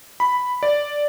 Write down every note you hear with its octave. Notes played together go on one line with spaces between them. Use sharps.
B5
D5